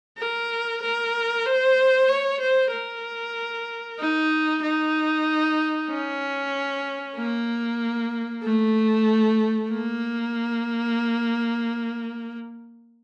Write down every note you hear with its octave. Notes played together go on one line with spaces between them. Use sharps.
A#4
A#4
C5
C#5
C5
A#4
D#4
D#4
C#4
A#3
A3
A#3